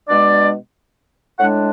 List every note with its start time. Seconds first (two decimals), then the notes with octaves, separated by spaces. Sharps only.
0.09 B2 G#3 D4 D5
1.39 A2 G#3 D4 F#5